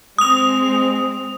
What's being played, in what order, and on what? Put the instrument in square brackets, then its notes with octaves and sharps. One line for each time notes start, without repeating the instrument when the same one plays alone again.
[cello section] G#3 C4 [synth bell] D#6 F7